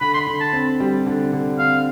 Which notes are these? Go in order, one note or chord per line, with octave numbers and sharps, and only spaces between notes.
D3 B5
C6
B5
D3
A5
C4
G3
D3
D3
C4 F5